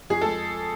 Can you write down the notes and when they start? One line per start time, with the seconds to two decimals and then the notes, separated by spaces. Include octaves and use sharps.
0.10 F2 G#4
0.21 G#3 A4